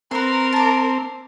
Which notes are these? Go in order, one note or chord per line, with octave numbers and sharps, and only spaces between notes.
C4 A#4 B4 C6
A5 D6